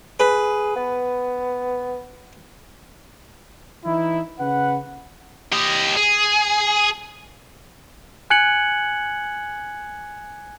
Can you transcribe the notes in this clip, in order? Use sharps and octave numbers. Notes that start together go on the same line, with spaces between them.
G#4 B4
B3
E3 D#4 E4
C#3 B4 F#5
G4 D#5
G#4
G#5 F#6 G#6 C#7 F#7